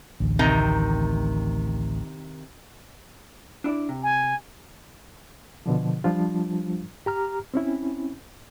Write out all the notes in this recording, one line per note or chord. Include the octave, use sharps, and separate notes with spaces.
A1 D2
C3 D#3 A#5
D4 E4 D5
C3
G#5
B2 D3 F3
F3 G3 D4 F4
G4 A#5 F6
C4 C#4 E4